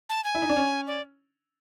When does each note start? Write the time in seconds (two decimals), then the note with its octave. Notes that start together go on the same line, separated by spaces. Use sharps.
0.09 A5
0.24 G#5
0.35 E4
0.42 D#4
0.49 D4
0.56 C#4
0.87 D5